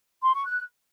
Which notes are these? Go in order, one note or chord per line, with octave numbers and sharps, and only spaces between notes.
C6
C#6
F#6